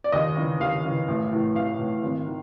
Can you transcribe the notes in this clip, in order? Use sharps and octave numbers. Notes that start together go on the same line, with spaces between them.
D5
D#2 D#5
C#3 E3
D#2 F5
C#3 E3
A1
A2 E3
A1 F5
A2 E3
G#1
D#3